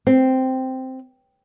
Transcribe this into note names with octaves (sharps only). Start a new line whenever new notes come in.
C4